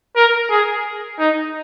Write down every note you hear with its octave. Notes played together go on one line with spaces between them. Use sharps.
A#4
G#4
D#4